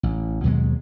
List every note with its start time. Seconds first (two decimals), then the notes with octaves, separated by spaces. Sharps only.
0.03 A1
0.44 D#2 B2 F#3 G#3